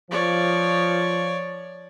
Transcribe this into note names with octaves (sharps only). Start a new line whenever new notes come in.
F3 C#5 D5